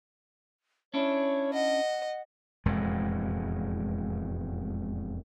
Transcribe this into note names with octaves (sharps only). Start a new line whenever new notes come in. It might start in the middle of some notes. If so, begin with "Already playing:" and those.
C#4 D4 E4 C#5
D#5 F#5
E1 F2 A2 G#3